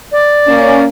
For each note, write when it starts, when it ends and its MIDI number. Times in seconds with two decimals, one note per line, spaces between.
0.12 0.85 74
0.47 0.85 58
0.47 0.85 61